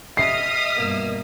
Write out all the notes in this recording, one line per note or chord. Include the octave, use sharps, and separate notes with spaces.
D#5 E5 D#6 F6 C7
G2 B2 A#3